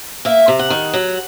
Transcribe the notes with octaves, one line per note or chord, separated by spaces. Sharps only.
A#3 E5
C3
F#5
D#3
F#3